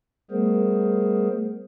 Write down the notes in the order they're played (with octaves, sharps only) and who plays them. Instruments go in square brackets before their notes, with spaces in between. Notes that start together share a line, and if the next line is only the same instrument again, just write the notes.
[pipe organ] G3 A3 B3 G#4 A#4 C5